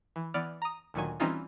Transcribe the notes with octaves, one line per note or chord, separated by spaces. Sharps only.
E3
E3 B3 D5 F6
A#5 D#6
D2 A#2 D#3 F#3 G#5
E3 G3 C4 C#4 D#4 F4